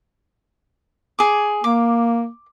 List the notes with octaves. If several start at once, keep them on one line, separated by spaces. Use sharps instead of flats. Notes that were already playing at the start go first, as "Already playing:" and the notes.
G#4 D6
A#3 D6